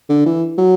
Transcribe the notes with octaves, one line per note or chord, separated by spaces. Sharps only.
D3
E3
F#3